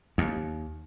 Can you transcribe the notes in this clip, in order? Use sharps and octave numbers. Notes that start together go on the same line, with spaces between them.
D#2